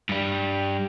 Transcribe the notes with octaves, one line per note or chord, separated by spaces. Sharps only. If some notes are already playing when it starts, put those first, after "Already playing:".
G2 G3